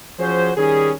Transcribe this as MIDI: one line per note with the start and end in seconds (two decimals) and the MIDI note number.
0.19 0.51 53
0.19 0.51 61
0.19 0.51 66
0.19 0.51 68
0.19 0.51 72
0.56 0.92 51
0.56 0.92 55
0.56 0.92 61
0.56 0.92 68